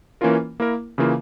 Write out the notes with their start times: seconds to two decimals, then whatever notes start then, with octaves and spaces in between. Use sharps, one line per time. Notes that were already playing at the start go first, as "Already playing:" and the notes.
0.21 E3 A#3 C#4 F4 A#4
0.60 A#3 E4 A#4
0.98 C#3 E3 A#3 F4